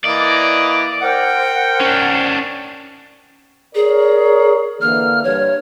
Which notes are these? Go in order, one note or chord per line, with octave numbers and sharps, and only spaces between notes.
E3 A#3 D5 D#5
A#4 C5 F#5 G5
C#4 D4
G#4 A#4 C#5 D5
D3 E3 A#3 F6
G2 C#5